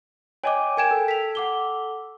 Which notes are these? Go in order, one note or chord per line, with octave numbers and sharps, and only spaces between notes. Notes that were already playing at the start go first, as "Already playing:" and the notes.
C#5 D#5 G5 G#5 D6
A#4 G5 G#5 G#6 E7
A4
B6 F7
F#5 D6 G7